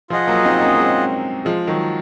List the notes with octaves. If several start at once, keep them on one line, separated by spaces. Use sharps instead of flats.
F3 F4 G#4 D#5 F#5
F#3 A#3
C4 D#4
A#3 C#4
G#3 C4
F3 G#3
D#3 F#3